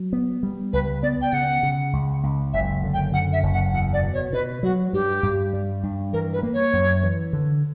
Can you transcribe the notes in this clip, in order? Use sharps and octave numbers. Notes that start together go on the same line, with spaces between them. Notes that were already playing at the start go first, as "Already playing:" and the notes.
Already playing: F#3
B3
G3
C#2 B4
B3 D5
G5
C#3 F#5
C#3
C#2
C#2
F#1 E5
D3
G5
F#2 F#5
E5
F#1
F#5
E2 F#5
D5
B2
C#5
B2 B4
F#3 F#4
G2 G4
G2
G3
G2
E3 A#4
B4
A#3
C#5
F#2
E3
D3